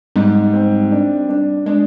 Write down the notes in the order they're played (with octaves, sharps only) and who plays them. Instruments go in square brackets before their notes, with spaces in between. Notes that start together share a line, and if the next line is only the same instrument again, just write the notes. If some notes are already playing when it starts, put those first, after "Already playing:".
[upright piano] G#2 [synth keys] G3
[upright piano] C4
D4
D4
[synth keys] G#3 [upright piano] D4